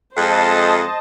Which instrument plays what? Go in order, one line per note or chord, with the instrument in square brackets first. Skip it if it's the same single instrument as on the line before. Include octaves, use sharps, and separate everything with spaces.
[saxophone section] F2 G#3 [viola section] C5 D#5 A5